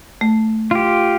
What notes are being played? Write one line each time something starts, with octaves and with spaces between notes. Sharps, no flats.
A3
F4 G4